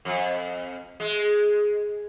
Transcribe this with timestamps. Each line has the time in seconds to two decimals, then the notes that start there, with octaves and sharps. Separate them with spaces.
0.05 F2
1.00 G#3